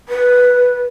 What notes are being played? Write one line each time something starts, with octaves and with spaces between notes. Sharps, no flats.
B4